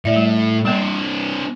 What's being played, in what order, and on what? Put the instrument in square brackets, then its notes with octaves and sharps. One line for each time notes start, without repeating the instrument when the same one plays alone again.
[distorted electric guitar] A2 [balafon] D5 E5
[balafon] G3
[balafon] G3 A#3 [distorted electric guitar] C4 D4